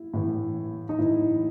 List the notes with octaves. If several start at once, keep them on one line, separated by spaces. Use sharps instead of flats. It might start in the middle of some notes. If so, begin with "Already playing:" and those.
Already playing: E4
A2 E3
D#4
A2 E3 E4